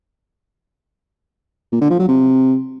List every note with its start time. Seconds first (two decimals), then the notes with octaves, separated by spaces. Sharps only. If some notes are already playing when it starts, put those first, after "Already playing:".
1.72 A#2
1.81 D3
1.90 F3
1.99 F#3
2.08 C3